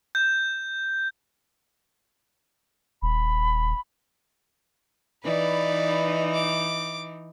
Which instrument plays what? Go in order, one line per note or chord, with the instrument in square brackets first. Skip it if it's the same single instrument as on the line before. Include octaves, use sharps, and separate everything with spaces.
[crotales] G6
[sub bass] D#1 [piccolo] B5
[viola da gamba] E3 D#4 [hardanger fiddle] B4 D5
[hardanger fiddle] D6